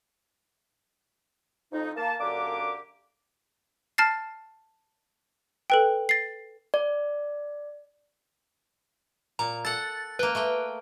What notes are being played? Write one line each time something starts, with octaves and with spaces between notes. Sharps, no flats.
F2 D#4
A#3 A5
F#2 D3 A#3 D4 G4 D6
A5 F6 A6 C7
A4 B4 G5
A6 C7
D5
A#2 A#5
A4 F#5 A6
A#3 B4 G5
A3 A#3 G5